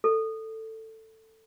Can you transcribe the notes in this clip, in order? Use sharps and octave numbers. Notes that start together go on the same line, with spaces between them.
A4